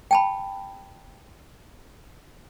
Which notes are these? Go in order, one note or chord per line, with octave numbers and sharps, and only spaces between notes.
G5 A5 B5